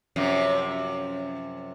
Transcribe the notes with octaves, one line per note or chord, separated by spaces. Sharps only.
F#2 C3 F3